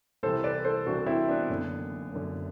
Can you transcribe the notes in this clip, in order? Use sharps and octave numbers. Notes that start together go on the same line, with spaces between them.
C2 C3 E3 A4 C5
B4 D5
A4 C5
C2 C3 E3 D4 F#4
C4 E4
B3 D4
F#1 F#2 D3
F#1 F#2 D3